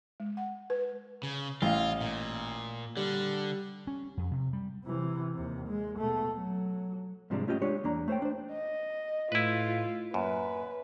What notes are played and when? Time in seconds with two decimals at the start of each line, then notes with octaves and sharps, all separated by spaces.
0.20 G#3
0.37 F#5
0.70 B4
1.23 C#3
1.62 A1 F4 F5
2.01 A#2
2.97 D3 G3
3.87 C#4
4.17 F2
4.32 C3
4.53 G3
4.85 C3 E3
5.34 D#2 C3
5.68 G#3
5.99 B2 A3
6.35 F#3
7.30 G#2 C3 F3 G3 G#3 D4
7.47 A3 C#4 F4 G4 D#5
7.62 G#3 D4 G4 G#4 C#5
7.84 E2 A#3 D4 A#5
8.08 A3 C5 C#5 G5
8.22 D4 C5
8.53 D#5
9.32 A2 E4 F4 B4
10.14 F#2 A#3 B4